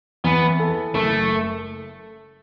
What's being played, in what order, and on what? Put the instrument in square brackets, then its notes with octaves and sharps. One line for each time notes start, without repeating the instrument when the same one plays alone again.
[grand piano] E2 [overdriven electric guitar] B3
[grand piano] A4
[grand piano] F#1 [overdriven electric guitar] A3